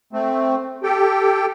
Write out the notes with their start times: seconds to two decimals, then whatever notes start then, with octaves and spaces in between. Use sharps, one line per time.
0.13 A3 C4
0.83 G4 A4 G5